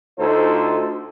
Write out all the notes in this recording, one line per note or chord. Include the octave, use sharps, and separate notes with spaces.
D2 D#4 F4 A4 C5